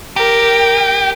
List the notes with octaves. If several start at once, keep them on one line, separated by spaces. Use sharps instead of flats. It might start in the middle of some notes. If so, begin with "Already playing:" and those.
G4 A#4